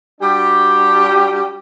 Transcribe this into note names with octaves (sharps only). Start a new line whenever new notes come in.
G3 D4 F#4 G4